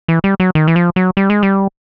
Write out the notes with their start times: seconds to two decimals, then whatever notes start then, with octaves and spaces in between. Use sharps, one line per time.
0.08 E3
0.24 G3
0.40 F#3
0.55 D#3
0.68 E3
0.76 F3
0.96 F#3
1.17 G3
1.30 G#3
1.43 G3